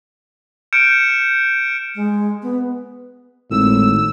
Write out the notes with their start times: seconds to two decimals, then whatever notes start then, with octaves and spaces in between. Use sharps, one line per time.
0.73 F6 G6 C#7 D7 E7
1.96 G#3
2.43 B3
3.51 G#1 A2 E6